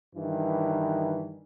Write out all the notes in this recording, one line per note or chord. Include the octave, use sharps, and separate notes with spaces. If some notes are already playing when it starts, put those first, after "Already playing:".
G2 D#3 E3